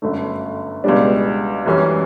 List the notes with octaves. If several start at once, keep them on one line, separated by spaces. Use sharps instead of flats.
G1 F#2 D3 A3
C#2 B2 G3 D4
F#2 E3 G3 C#4